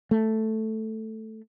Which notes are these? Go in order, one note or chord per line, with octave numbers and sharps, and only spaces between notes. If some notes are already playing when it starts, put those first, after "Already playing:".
A3